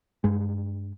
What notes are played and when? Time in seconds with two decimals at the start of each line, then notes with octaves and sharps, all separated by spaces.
0.24 G2 G#3